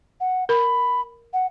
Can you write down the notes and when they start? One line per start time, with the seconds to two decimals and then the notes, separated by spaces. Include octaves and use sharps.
0.20 F#5
0.49 A#4 B5
1.33 F#5